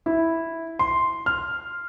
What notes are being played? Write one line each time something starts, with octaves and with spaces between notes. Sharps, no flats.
E4
C6
F6